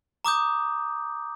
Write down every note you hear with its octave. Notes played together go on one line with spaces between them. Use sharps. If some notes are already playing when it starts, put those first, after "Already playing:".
A#5 D6 D#6 G6